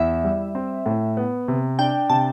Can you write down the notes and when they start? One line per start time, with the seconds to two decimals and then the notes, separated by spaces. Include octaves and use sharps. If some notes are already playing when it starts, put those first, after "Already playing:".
Already playing: E2 E4 E5
0.24 G3
0.55 C4
0.86 A2
1.17 B3
1.48 C3
1.79 D4 G5
2.10 C3 A5